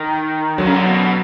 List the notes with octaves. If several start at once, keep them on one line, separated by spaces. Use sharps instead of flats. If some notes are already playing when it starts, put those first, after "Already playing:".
Already playing: D#3
D3 F#3
C#3
D3
B2